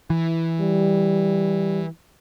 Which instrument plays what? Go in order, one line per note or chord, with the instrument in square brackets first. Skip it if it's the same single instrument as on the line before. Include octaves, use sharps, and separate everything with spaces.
[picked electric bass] E3
[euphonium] G3